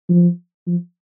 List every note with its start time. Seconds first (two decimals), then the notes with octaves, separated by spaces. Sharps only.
0.09 F3
0.67 F3